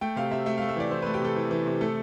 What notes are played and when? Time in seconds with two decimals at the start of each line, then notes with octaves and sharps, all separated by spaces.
0.01 A3 G5
0.16 C3 F5
0.31 C3 E5
0.46 A3 E5
0.58 A3 F5
0.69 E5
0.76 E3 D5
0.91 E3 C5
1.02 A3 B4
1.14 G4
1.21 C3 A4
1.36 E3
1.51 E3
1.66 C3
1.81 A3 A4